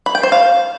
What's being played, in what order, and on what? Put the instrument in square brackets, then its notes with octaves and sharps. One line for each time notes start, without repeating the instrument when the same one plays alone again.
[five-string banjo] B5
G5
C5
F5